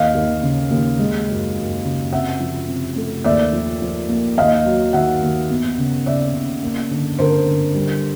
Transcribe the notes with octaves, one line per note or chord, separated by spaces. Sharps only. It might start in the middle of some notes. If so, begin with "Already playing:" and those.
Already playing: D#2 D#5 F5
D#2
C#3
D#2
G#3
F#2
F#2
C#3
C3 E5 F#5
F3
C3
A3
D#2 D5 E5
F3
F3
A#3
D#2 D#5 F5
F#3
D#3 E5 F#5
D#2
B3
C#3
C#3 D5 E5
C#3
A#3
D3
D3 A#4 C5
D3
G3